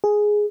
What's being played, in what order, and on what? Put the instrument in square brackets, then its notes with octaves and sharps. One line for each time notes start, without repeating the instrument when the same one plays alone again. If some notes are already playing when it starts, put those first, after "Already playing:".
[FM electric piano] G#4